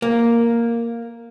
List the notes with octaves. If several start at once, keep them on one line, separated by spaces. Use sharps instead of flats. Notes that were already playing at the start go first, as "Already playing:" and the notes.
A#3